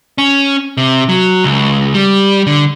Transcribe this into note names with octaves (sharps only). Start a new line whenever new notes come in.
C#4
C3
F#3
C#2
G3
D3